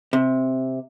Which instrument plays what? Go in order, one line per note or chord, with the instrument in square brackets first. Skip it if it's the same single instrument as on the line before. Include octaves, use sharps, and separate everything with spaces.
[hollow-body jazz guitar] C3